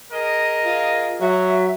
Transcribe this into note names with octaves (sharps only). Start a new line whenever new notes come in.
G#4 A#4 D#5
F4
F#3 F#4 E5